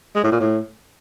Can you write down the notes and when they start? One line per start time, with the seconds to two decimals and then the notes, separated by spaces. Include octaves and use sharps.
0.15 G#3
0.24 A2
0.32 A#2
0.40 A2